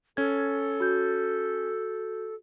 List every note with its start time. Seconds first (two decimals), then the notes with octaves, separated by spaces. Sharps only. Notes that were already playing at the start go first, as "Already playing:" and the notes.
0.17 C#4 A4 G#6
0.80 F#4 G6